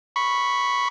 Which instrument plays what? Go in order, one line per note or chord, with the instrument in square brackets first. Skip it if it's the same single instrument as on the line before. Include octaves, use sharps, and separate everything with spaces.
[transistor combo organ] B5 C#6